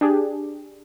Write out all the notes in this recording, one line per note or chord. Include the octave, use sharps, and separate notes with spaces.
D4 G4 G#4